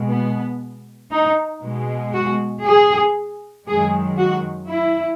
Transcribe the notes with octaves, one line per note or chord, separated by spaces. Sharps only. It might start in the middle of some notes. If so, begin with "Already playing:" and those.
Already playing: B2 G#3
B3
D#4
B2 G#3
F#4
G#4
F#2 D#3 G#3 G#4
F#4
E4